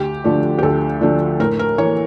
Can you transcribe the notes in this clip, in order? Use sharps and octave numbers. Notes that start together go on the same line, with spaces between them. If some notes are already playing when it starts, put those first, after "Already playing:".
Already playing: D2 G4
D3 F3 A3 D4
G4
D2 A4
D3 F3 A3 D4
A2 A#4
A#4
E3 A#3 C#5